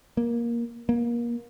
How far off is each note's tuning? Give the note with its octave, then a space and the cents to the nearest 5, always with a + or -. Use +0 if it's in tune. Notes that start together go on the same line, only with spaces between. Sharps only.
A#3 +15
A#3 +30